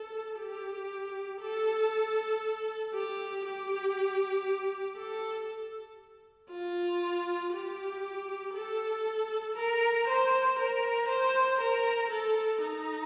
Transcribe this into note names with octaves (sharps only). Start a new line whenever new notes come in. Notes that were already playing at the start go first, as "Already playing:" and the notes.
Already playing: A4
G4
A4
G4
G4
A4
F4
G4
A4
A#4
C5
A#4
C5
A#4
A4
D#4